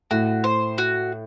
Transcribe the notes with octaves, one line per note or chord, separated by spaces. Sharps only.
A2 F#4
C5
F#4